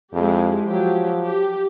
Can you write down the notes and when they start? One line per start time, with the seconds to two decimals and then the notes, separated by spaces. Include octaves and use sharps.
0.14 F2 G#3 E4 G4
0.67 F3 F#3 G4
1.24 G4